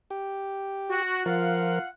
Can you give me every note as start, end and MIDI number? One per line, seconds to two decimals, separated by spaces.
0.10 1.02 67
0.89 1.25 66
1.26 1.79 53
1.26 1.89 65
1.26 1.79 70
1.26 1.89 77
1.26 1.89 78